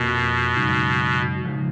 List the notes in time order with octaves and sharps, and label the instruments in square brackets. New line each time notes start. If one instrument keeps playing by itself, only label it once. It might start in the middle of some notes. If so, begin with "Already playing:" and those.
Already playing: [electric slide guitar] F2 F3 A#3 [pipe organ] B2
[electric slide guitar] F#2 C#3 G#3 D#4
C#3 F3 G#3 D#4